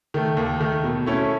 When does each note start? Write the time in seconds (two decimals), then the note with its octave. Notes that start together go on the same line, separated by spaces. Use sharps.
0.14 D#3 A3
0.37 D#2
0.60 D#3 A3
0.84 B2
1.06 A3 C#4 E4 A4